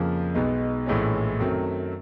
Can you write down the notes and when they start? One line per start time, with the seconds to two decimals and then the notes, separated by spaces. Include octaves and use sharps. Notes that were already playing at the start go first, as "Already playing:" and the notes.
Already playing: F2 C#3 F3 A#3
0.34 B1 B2 G#3 B3 D#4
0.86 A#1 A2 E3 G#3 C#4
1.39 F#2 D#3 F#3 A3 C4